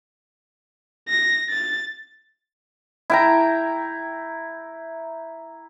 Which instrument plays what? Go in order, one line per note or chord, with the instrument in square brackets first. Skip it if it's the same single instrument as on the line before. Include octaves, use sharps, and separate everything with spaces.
[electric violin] A#6
A6
[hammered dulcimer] E4 G5 A#5